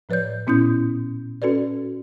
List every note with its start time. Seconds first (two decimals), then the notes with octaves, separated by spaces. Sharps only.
0.09 A2 F3 B4 C#5 D5 G6
0.47 A#2 B3 C#4 E4 D#6 G6
1.42 C#4 F#4 A4 B4 D5